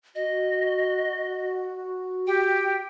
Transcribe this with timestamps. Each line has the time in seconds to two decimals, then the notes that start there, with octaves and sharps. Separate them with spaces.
0.15 F#4 D#5
2.27 G4 G5